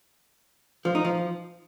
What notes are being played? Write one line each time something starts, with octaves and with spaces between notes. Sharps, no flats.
F3
D#4
F3